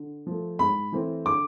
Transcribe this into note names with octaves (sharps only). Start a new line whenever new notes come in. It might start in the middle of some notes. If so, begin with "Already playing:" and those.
Already playing: D3
F3 A3
G#2 B5
E3 A3 C4
D3 D6